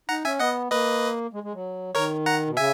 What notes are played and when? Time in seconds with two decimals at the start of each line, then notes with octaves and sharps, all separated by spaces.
0.09 D#4 F#5 A#5
0.25 C#4 E5 G#5
0.40 B3 D#5 F#5
0.71 A#3 B4 D#5
1.33 G#3
1.43 G#3
1.54 F#3
1.95 D#3 A#4 C#5
2.26 F#5 A#5
2.47 B2
2.57 C#3 E5 G#5